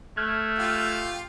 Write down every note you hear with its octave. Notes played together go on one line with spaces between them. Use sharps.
A3 F6 F#6 G#6
F4 G4 F5